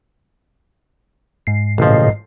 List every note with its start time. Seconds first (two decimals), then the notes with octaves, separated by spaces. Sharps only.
1.47 G#2 C7
1.78 A1 A#2 C#3 F3 D#5